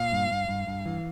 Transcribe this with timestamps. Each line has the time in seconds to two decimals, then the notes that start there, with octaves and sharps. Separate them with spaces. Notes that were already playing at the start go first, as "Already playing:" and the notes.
Already playing: A#2 F5
0.12 G2
0.31 G2
0.49 G2
0.67 G2
0.86 E3